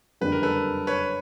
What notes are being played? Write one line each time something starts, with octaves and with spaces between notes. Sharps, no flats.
F#1 F2 D3 G3 B4
A#4
A4 B4
B4 C#5